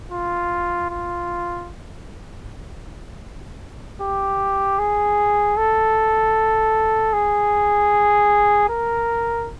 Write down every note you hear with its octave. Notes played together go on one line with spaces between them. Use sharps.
F4
F4
G4
G#4
A4
G#4
A#4